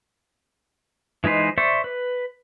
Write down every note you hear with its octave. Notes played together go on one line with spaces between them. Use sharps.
E3 G#3 D#4 B4 C5
C5 D5 E5 C#6
B4